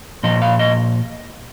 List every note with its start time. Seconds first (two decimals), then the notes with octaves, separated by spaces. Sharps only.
0.23 A#2 F3 D#5
0.42 F5
0.59 D#5